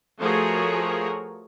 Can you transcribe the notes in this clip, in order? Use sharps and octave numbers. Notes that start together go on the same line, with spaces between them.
F3 A3 F#4 G#4 A#4 C#5